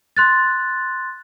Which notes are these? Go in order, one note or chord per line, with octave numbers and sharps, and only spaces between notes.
C6 F#6 A6